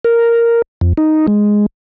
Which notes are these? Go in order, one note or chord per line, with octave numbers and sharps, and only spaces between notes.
A#4
F2
D#4
G#3